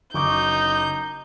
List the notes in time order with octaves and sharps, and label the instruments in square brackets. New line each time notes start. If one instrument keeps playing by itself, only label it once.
[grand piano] F#1 C#6 D6 [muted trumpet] D#4 [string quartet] G6